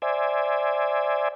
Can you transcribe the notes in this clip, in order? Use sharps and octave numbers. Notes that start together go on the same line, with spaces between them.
C5 D5 E5 G#5